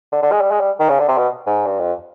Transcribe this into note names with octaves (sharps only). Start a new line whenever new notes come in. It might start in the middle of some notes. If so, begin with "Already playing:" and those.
D3
D3
G#3
G3
G#3
G3
D#3
C#3
D3
C3
B2
G#2
G2
F2